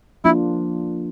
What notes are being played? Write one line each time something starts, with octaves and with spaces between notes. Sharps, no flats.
F3 A#3 D4 E4 F4